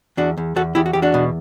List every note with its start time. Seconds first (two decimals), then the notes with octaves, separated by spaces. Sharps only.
0.17 E2 D4 F#4
0.37 E2
0.56 E2 F#4 A4
0.75 E2 E4 G4
0.86 F#4
0.93 E2 G4
1.02 D4 F#4
1.14 B2